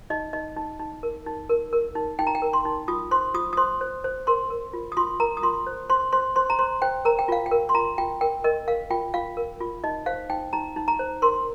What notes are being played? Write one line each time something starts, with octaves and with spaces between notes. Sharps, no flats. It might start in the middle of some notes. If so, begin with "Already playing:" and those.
D#4 D#5
D#4 D#5
D#4
D#4
A#4
D#4
A#4
A#4
D#4
D#4 G5
A#5
G5
A#4
C6
D#4
F4 D#6
C5 C6
F4 D#6
D#6
C5 C6
C5
C5
A#4 C6
A#4
F4
D#6
F4 C6
A#4 A#5
D#6
F4 C6
C5
C5 C6
C5 C6
C5 C6
A#5
C5 C6
C5 G5
A#4 A#5
G5
F4 F5
G5
A#4
C6
F4 A#5
F4 G5
A#4 G5
A#4 D#5
A#4 F5
F4 G5
F4 F5
A#4
F4
D#4 D#5
C5 F5
D#4 G5
D#4 A#5
D#4
A#5
C5
A#4 C6